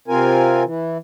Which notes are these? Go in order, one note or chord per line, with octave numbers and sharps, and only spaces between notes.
C3 C4 F4 A#4 G#5
E3